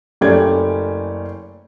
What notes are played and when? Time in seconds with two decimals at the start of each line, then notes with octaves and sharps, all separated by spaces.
0.21 F#1 A3 C#4 G4 D5 G#6